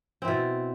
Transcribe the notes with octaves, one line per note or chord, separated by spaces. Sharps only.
B2 C4 E4